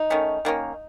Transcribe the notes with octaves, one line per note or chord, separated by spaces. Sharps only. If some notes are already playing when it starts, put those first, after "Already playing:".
Already playing: D#4
D#3 A3 C#4
D#3 A#3 C#4